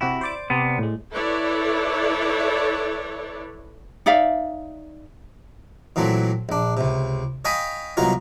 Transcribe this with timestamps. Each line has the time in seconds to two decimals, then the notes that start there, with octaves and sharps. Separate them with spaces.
0.01 C3 E4 F#4 G4
0.21 C5 D5 D6
0.50 C3 B3
0.79 A2 G#3
1.13 E4 A4 B4 C#5 D5
4.06 D#4 D5 E5 F5
5.96 A#2 E3 F#3 A3 C4
6.49 A#1 D4
6.77 C#2 C3
7.45 C#5 D#5 F5 G5 G#5 B5
7.97 C2 B2 F#3 F4 A#4 C#5